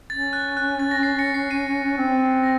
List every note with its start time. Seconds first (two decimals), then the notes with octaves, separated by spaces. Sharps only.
0.10 C#4 A6
0.33 F#6
0.57 F#6
0.80 A6
0.91 A#6
1.03 C7
1.19 A#6 C#7
1.34 C7
1.51 C7 D#7
1.97 C4
2.43 A#6